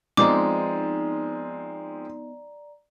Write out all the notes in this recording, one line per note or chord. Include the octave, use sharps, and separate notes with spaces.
F3 G#3 B3 C4 D#4 D5 A#5 D6